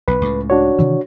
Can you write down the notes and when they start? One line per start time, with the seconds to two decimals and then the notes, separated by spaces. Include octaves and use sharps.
0.08 B1 B4
0.21 C#2 A2
0.50 D4 F#4 C#5
0.79 C3 D#3 E3